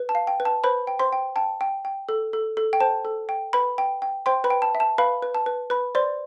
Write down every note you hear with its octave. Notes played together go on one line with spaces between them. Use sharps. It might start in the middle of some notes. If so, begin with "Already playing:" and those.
Already playing: B4
A5
F5
G5
B4
A5
B4 C5 B5
G5
C5 C6
G5
G5 A5
G5
G5
A4
A4
A4
G5
C5 A5
A4
G5
B4 B5
G5
G5
C5 G5 C6
B4 B5
G5
A5
E5
A5
B4 F5 B5
B4
A5
B4
B4 B5
C5 D5 C6